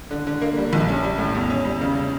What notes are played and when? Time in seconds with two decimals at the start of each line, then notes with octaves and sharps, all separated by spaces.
0.11 D3
0.27 D3
0.41 A#3
0.57 G3
0.73 A#1
0.88 C#4
1.03 G3
1.18 A2
1.35 E2
1.50 C#4
1.65 G3
1.81 C#3